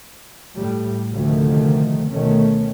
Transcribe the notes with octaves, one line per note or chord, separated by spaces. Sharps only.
A2 G3
D2 C3 D#3 F3 A3
B2 D#3 A3 C#4